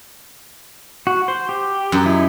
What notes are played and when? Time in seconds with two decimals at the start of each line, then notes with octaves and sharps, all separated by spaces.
1.07 F#4
1.28 C5
1.49 G4
1.92 F#2
2.06 D#4 E4